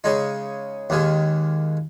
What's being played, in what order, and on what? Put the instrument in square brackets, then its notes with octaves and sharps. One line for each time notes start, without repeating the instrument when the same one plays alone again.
[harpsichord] C#3 G#3 D#4
D#2 D#3 G#3